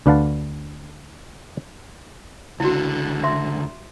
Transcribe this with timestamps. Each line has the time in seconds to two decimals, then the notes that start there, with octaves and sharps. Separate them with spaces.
0.06 D2 D4 B4 F5 F#5 A5
2.60 C#2 D3 E4 F#4
3.24 E5 C6